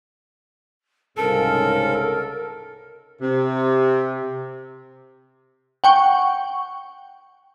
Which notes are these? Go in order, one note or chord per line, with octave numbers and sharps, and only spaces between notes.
C2 G#2 C#3 A4 A#4
C3
F#5 G5 C#6